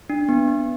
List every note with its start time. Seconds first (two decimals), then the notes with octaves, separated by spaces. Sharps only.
0.10 D4
0.29 B3
0.48 B3